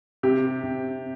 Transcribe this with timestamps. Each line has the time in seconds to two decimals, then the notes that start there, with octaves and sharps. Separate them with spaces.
0.23 C3 G4
0.63 C3